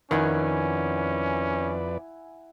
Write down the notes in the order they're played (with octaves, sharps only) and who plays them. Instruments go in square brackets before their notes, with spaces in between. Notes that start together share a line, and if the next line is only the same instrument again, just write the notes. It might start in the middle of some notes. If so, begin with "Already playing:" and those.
[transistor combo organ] F2 B4 D5 [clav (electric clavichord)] D#3 [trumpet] C#4 [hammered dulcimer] E4 F#5 G#5